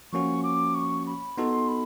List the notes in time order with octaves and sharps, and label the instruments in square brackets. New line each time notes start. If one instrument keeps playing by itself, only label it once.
[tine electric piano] F3 A#3 C#4 F#4 [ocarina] C#6
[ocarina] D6
C#6
B5
[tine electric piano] B3 D#4 F#4 A4 [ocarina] C6
[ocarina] B5